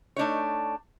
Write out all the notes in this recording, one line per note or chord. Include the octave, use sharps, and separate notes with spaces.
A3 D4 D#4 C#5